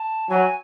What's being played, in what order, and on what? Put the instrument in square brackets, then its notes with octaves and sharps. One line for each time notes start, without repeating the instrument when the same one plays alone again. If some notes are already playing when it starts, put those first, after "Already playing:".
Already playing: [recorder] A5
[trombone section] F#3 [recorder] G#5